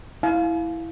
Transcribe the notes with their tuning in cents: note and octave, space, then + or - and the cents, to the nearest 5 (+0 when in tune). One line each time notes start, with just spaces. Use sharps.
E4 +0 F5 +0 G#5 +45